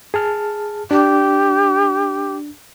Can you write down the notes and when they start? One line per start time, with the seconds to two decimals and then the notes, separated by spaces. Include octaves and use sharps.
0.14 G#4 A5 F6
0.91 D4 G4